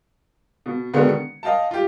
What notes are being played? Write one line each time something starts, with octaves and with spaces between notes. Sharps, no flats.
B2
B2 D3 D#3 G#3 B3
C#7
D#5 F5 G5 A5
F4 G4